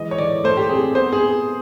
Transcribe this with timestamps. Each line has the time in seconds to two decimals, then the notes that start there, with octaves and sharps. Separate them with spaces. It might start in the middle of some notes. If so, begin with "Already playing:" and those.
Already playing: E3 G#3 D#5
0.11 C#5
0.18 E3 D5
0.44 A3 C5
0.57 G4
0.69 C4 G#4
0.95 B3 C5
1.13 G#4